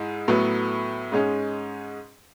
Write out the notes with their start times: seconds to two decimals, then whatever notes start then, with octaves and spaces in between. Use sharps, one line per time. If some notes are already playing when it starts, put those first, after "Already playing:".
Already playing: G#2 G#3 E4
0.28 A2 F#3 B3
1.12 G#2 G#3 C#4